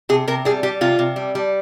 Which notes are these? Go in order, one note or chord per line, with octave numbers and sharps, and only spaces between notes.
C3 G#4
C3 A#4
G3 G#4
G3 G4
C3 F4
C3
G3
G3